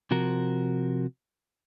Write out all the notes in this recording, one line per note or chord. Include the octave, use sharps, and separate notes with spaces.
C3 F3 F#4 A#4